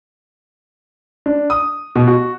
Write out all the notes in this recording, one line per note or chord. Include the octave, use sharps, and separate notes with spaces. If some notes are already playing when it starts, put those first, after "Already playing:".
D4
D#6
B2
F#4